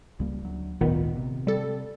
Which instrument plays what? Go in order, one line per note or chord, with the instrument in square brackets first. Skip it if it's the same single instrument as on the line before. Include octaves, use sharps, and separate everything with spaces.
[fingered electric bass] C#2 G3 A#3
D2 F#3
[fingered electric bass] G#1 D2 [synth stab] A#2 D#3 B3
[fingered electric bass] C3
[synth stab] G3 A4